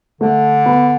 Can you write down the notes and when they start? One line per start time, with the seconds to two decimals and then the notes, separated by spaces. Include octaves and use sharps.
0.21 D3 A3
0.66 B3